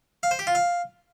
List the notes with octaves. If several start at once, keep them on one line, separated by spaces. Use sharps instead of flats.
F5
C5
G4
F4
F5